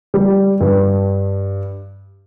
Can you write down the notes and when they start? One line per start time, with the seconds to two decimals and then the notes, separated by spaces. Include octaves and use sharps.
0.14 G3
0.61 G2